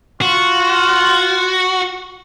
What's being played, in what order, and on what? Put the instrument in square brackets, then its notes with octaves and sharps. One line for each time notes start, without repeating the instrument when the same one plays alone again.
[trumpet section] F4 [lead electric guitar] F#4